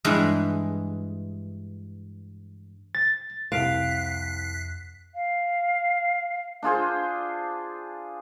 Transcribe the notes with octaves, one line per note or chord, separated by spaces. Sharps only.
G2 E3 G#3 G#4
A6
C2 F2 C4 F5 F#6 B6 C7 D7
F5
D4 F4 G#4 C5